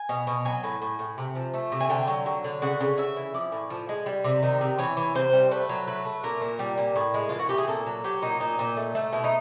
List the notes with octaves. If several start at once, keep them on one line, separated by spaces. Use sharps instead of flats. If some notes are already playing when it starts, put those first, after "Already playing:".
Already playing: G#5
B2
B2
F#3 G#5
A2
A2
A2
C3
F3
A3
C3
G#5
D3 G5
F#3
F#3
D3
C#3 F#5
C#3
C#3 E5
E3
F3 D5
A2
F3
G#3
G3
C3
D#3
C3
E3 C#5
E3
C3 C5
G3
A3 B4
F#3
A3 B4
A3
A#2 A#4
A#2
G3
A#2
A2
G#3
E3 F4
F#4
A2 G4
G#4
A#2 A4
F#3
F#3 G4
A#2 D#4
A#2 D#4
A#2
A3
A3
B2 E4
D#4